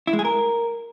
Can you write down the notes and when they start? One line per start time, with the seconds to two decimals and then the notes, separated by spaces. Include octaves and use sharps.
0.07 E4
0.13 G#3
0.19 G#4
0.25 A#4